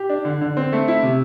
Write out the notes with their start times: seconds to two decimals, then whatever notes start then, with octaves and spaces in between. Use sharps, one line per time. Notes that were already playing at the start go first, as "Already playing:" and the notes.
Already playing: G4
0.09 D4
0.25 D3
0.41 D3
0.57 C4
0.72 A3
0.88 E4
1.03 C3